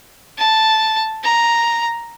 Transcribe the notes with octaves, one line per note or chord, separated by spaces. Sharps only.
A5
A#5